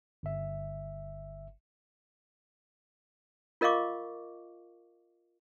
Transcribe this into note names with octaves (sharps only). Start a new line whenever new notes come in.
G1 E5
F4 A#4 D#5 F5 C#6 D6